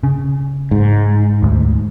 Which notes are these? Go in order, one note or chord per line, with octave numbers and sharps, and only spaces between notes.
C#3
G#2
D#1 D2